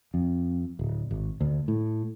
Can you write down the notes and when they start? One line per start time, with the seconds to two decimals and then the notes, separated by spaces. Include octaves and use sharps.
0.14 F2
0.79 D1
1.11 G#1
1.41 D2
1.68 A2